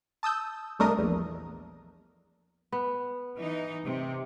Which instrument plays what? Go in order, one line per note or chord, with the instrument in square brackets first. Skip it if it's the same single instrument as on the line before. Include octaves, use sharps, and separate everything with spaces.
[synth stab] A5 D#6 E6 G6
C2 A3 D4 A#4 D#5 D#6
A#1 E2
[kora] B3
[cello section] E3 D#4
C3